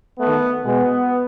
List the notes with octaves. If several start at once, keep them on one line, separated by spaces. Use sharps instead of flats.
D#3 A3 B3
B2 G#3 B3